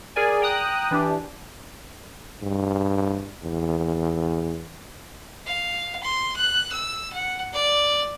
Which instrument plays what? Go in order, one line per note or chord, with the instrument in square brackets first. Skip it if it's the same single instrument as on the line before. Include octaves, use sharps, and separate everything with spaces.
[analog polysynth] G#4 A#4 D5 G#5
G5 A#5 D#6 F#6
E3 D4 G4
[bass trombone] G2
E2
[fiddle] F5
C6
F#6
E6
F#5
D5